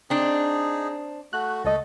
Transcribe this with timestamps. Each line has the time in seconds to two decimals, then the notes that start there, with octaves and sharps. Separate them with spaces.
0.10 C4 D4 D#4 G#4
1.33 A3 F#4 F#6
1.65 C#2 A3 A4 D#5